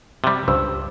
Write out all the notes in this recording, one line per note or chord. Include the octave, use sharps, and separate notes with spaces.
C3 G3
C#2 G2 C5 E6